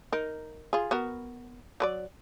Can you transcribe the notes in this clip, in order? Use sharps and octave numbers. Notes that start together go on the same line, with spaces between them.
D#4 A#4
F4 G#4
B3 F#4 A#4
F#3 B4 D5